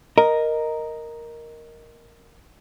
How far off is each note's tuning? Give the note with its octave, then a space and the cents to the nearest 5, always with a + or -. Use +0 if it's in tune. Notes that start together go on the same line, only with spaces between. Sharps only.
A#4 +0 D#5 +0